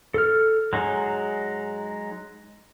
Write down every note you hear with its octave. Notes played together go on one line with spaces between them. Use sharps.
A4 F6
F#3 G#3 D#4 G#4